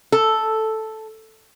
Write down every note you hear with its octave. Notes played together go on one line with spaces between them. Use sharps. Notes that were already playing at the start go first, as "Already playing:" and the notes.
A4